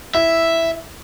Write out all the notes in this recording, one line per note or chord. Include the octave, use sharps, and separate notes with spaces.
E4 E5